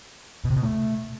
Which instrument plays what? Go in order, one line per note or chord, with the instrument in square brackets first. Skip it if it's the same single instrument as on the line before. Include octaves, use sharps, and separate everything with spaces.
[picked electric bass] B2
C3
B2
A3